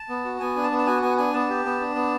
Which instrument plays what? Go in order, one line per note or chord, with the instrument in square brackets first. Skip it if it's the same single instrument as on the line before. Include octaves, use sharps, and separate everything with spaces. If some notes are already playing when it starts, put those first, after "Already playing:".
Already playing: [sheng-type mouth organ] A5
B3
F#4
B3 G#5
D4
A5
B3
A5
F#4 G#5
B3 G#5
D4 G#5
B3 A5
G4
B3
D4
B3